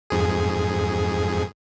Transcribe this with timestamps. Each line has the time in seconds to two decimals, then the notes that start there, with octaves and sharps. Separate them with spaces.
0.10 F2 G#2 G#4